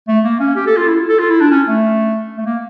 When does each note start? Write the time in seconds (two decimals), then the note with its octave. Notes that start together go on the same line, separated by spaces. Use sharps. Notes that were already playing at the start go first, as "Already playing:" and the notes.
0.08 A3
0.25 A#3
0.40 C#4
0.56 G4
0.67 A4
0.77 F4
0.88 E4
1.09 A4
1.19 F4
1.30 E4
1.41 D4
1.51 C#4
1.67 A3
2.38 A3
2.46 A#3